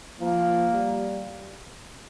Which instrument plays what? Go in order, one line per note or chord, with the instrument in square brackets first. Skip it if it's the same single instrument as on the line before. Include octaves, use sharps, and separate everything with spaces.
[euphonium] F3 [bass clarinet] A#3
[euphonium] G3